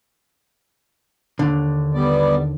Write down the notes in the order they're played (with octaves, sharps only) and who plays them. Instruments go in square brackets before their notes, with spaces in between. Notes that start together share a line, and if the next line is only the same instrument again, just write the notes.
[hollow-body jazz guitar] D#2 D3
[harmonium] G3 B3 D5